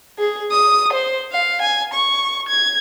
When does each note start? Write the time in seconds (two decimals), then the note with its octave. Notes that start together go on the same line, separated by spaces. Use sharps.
0.19 G#4
0.51 D#6
0.93 C5
1.32 F5
1.62 G#5
1.94 C#6
2.49 G#6